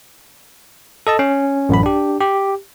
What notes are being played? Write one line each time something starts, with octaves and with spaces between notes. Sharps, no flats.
A4 D#5 A5
C#4
A1 F#2 B5
D4 G4
G4